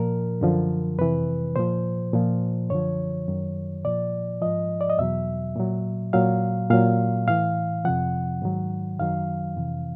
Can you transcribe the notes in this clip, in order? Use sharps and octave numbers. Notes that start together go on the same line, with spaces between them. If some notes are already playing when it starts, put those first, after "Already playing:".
Already playing: A#2 F3 A#4
F#2 D3 F3
F2 C3 E3 B4
A#2 F3 C5
A#2 F3
F#2 D3 F3 C#5
F#2 D#3 F#3
A#2 F3 D5
G#2 F3 D#5
D5
D#5
E2 B2 F#3 E5
A#2 F#3
A#2 F#3 F5
A#2 F#3 F5
A2 E3 F5
F2 C3 F3 F#5
G#2 D#3 F#3
F#2 D#3 F#3 F5
F2 C3 E3